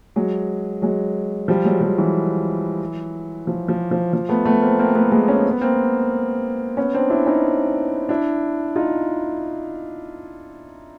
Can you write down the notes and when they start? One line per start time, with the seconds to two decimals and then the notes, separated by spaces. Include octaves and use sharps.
0.16 F#3 G#3
0.82 F#3 G#3
1.48 F3 G3
1.65 F#3 G#3
1.81 F3 G3
1.98 E3 F#3
3.47 F3
3.68 F3
3.91 F3
4.13 F3
4.29 A3 B3
4.45 A3 B3
4.62 A#3 C4
4.79 A#3 C4
4.95 A3 B3
5.11 G#3 A#3
5.28 C#4
5.40 C4
5.51 B3
5.61 A#3 C4
6.77 B3 C#4
6.94 C4 D4
7.10 D4 E4
7.26 C#4 D#4
8.09 D4 E4
8.76 D#4 F4